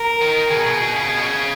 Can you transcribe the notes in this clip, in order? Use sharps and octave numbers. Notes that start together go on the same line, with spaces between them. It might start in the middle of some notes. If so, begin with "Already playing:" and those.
Already playing: A#4
D#3
B2 G#4
B2
B2
C#3
B2
C#3